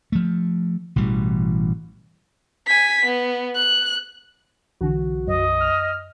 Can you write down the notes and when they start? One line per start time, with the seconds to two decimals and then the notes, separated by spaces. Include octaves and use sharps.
0.12 F3 A3
0.96 A1 B2 E3 G3
2.67 G#5 B6
3.05 B3
3.55 F#6
4.81 B1 D3 E3 F#4
5.27 F#2 D#5
5.60 F6